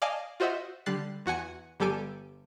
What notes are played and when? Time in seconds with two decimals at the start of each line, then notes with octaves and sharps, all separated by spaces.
0.02 D5 D#5 F5 G#5 A5
0.40 F4 F#4 C5 D#5 E5 F#5
0.86 D3 G3 F#6 A6 C7
1.26 E2 F#4 F#5 G#5 C#7
1.80 G1 G3 G4 A4 G#5 D7